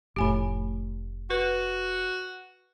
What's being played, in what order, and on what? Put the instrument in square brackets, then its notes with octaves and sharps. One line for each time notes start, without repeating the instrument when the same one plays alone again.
[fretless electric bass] F1 A2 [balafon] G4 G#5 B5
[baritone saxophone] F#4 [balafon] B4